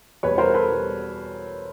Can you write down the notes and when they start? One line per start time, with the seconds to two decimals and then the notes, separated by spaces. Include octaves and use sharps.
0.23 E2 B2 G3 B4 C#5
0.38 A#4 C5
0.54 A4 B4
0.70 B2 G3